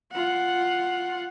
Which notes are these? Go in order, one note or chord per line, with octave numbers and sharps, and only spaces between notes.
F4 F#5